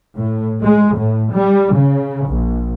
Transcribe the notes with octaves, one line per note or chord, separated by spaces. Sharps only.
A2
G#3
A2
G3
C#3
A#1